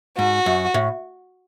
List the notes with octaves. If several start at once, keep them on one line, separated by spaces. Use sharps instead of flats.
G#2 F#4
F#2
A2